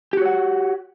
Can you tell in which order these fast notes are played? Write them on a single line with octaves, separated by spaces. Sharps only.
G4 F#4 C#5 F#5